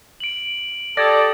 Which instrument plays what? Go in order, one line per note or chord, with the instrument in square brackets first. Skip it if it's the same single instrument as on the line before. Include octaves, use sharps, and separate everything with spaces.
[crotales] D7 F#7
[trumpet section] G4 A4 [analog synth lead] D5 [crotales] D#6 G#6 A#6